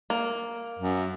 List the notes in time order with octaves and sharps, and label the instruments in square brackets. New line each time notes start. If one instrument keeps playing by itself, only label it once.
[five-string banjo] A#3
[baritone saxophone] F#2